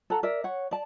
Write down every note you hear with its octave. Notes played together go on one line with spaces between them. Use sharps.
A4 F#5 A#5
A#4 D5 E5
C#5 F#5
D5 A5